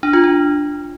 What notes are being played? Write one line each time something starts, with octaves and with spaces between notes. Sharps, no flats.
D4
F4
D4